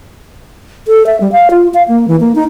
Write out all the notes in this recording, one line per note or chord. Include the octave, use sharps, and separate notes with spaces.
A4
E5
G3
F5
F4
F5
A#3
E3
A#3
D#4